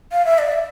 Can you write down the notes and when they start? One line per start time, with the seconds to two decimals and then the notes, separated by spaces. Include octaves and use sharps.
0.12 F5
0.25 E5
0.39 D5
0.52 E5